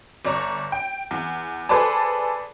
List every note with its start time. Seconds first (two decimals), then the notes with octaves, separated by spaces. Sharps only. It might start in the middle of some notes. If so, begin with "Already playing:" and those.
0.25 G1 D5 A#5 C#6
0.72 G5
1.11 E2
1.69 G#4 A4 B4 C5 D5 A5